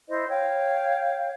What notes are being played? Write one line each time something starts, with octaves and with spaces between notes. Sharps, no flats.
E4 C5 D#5
C#5 F5 G5